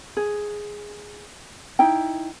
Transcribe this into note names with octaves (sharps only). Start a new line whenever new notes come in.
G#4
D#4 E4 G5